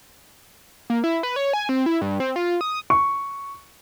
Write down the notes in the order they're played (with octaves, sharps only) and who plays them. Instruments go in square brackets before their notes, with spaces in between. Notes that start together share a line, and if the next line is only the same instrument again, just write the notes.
[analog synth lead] A#3
E4
B4
C#5
G#5
C4
E4
G2
C4
F4
D#6
[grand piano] C#6